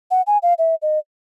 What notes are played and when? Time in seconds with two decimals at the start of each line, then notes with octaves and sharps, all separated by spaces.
0.11 F#5
0.27 G#5
0.43 F5
0.58 E5
0.82 D#5